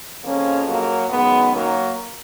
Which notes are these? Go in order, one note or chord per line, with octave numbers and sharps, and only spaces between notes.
F2 C#3 F3 A#3 C#4
F#3 A#3
F#2 D#3 G#3 B3
F#3 A#3